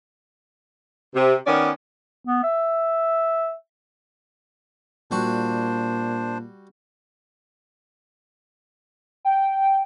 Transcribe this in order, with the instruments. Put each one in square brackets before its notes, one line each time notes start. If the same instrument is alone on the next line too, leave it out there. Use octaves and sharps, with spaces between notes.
[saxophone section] C3
D#3 B3 C#4 C#5 D5
[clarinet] B3
E5
[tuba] A#2 [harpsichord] G3 F#4 [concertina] D4 C5
[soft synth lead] G5